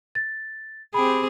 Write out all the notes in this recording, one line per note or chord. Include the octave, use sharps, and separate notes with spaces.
A6
C4 G4 G#4 B5